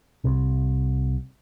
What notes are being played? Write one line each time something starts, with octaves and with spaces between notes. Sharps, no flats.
C2 C3